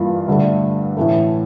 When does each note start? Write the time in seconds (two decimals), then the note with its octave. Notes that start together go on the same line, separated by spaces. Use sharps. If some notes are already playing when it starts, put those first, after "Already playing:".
Already playing: G2 E3 A#3 F4
0.28 G2 D3 A3
0.97 A2 E3 A3